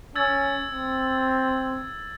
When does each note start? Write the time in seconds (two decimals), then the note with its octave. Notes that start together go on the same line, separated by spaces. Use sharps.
0.16 C#4 E6 G#6 A6
0.71 C4